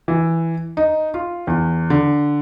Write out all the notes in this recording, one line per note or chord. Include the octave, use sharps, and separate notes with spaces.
E3
D#4
F4
E2
D3